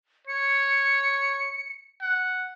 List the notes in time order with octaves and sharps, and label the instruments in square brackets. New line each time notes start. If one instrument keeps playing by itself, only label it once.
[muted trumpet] C#5 [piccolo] C#7
[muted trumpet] F#5